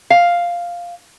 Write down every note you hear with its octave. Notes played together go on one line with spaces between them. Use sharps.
F5